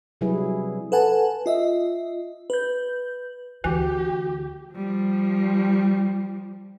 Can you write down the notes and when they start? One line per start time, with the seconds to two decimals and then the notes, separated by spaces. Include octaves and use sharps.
0.21 C3 F#3 G3 E4 G#4 B4
0.92 A4 B4 F#5 G#5 A5
1.46 F4 D#5 E5
2.50 B4 G6
3.64 D2 E3 F#4 G4
4.72 F3 G3